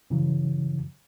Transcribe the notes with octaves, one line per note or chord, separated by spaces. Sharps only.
G2 C#3 E3 F#3